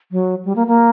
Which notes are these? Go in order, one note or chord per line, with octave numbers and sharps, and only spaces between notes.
F#3
G3
A#3
A#3